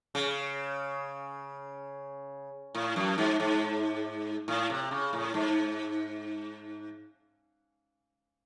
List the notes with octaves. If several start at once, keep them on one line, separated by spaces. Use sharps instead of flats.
C#3
A2
F#2
G#2
G#2
A2
C3
C#3
A2
G#2